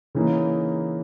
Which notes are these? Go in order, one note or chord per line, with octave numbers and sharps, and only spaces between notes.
C#3 E3 A#3 D#4